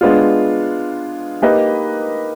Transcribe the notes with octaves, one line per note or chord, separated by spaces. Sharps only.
G#3 B3 D4 F4
A#3 D#4 G4 B4 D#5